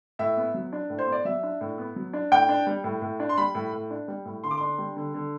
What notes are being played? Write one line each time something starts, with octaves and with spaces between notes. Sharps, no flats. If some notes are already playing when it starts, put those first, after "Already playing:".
A2 E5
B3
F#3
D4
A2
C5
B3
D5
F#3 E5
D4
A2
B3
F#3
D4
A2 G5
D4
G3
A2
A2
D4
C6
G3 B5
A2
A2
D4
G3
A2
D3 C6
D6
D4 C6
G3
D3
D3